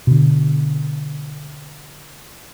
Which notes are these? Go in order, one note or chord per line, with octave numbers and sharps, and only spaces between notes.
B2 D3